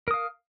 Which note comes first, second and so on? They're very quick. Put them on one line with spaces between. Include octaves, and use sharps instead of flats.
A#4 D#6 F5